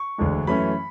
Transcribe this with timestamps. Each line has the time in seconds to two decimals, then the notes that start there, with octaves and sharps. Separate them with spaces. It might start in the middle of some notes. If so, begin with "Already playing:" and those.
Already playing: C#6
0.18 E1 D2 D3 G#3
0.47 F#2 E3 A3 C#4 B5